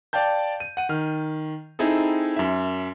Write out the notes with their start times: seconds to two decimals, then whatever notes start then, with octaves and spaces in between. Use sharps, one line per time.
0.13 D5 F5 G5 A5 G6
0.60 D#7
0.77 F#5 D#7
0.89 D#3 F6
1.79 C4 D#4 E4 G#4 A4
2.36 F#2 E5